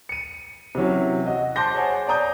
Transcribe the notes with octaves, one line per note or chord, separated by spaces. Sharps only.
C#7 D#7
C3 E3 F#3 C#4
F#4 D#5
C5 A5 C6 D6 G6 A#6
G#4 C5 C#5 F#5 G#5 A5
C#5 D5 A5 A#5 D#6 G6